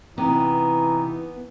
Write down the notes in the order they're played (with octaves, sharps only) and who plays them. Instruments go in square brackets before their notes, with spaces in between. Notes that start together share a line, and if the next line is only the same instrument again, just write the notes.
[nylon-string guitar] C3 [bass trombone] E3 [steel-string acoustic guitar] B3 [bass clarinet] D#4